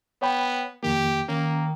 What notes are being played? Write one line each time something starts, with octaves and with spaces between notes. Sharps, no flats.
B3 C#5 G5 B5
F2 D#3 A#3 G4
D#3 A#3 C#4